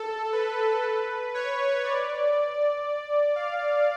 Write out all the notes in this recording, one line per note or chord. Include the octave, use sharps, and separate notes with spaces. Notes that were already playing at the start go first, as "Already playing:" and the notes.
Already playing: A4
B4
C#5
D5
F5